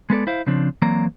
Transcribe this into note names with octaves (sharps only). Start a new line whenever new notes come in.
G#3 B3 A4 D5
E4 C5 F5
C#3 F3 C4 D4
E3 F#3 A#3 C4 D5 A#5